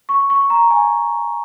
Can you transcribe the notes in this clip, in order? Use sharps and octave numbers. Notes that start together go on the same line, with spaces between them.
C#6
C#6
A#5
G#5